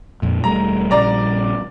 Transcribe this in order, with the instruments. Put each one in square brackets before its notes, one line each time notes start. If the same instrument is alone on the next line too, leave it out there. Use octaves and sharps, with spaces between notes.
[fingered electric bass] F2 A#2
[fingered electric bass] E1 G3 A3 [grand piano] A#5
[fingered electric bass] A#1 C#3 G3 [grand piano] D5 A#5